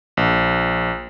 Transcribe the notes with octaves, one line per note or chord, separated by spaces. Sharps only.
A#1